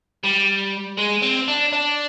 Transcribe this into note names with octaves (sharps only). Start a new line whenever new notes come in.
G3
G#3
C4
D4
D4